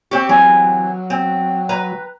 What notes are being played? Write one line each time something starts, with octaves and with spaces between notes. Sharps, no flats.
C4 G4 C#6
E3 F#3 C4
C4
B4 A#5